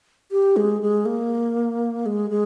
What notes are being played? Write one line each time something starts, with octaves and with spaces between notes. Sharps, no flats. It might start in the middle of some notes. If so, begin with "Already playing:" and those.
G4
G#3
G#3
A#3
G#3
G#3